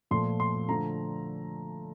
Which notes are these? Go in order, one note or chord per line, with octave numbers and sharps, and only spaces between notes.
A#2 F3 A3 C6
C6
D3 F3 A3 A#5